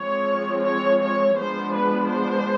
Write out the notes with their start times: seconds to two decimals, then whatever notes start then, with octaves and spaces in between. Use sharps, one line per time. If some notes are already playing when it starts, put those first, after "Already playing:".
Already playing: F3 G#3 C4 C#5
0.65 C#5
1.02 C#5
1.38 F3 G#3 B3 D4 C5
1.75 B4
2.12 C5